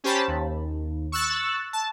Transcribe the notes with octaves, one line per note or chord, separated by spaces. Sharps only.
C#4 G4 C5 A5 B5
D#2
C#6 E6 F#6 A6
A5